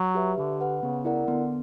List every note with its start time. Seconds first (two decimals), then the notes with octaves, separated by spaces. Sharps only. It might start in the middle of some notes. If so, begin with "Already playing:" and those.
Already playing: F#3
0.15 G4 B4 E5
0.38 D3 G4
0.61 B4 F#5
0.83 C#3 B3
1.05 E4 A#4 D5 F#5
1.28 D3 B3